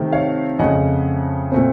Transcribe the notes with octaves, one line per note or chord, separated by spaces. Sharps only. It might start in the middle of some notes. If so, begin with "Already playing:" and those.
Already playing: C3 D#3 A3 C4
C#5 F5
F2 C#3 A3 D#5 F#5
A#2 A3 C4